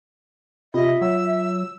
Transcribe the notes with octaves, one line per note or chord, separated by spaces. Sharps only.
C3 F4 D#5 E5
F#3 E6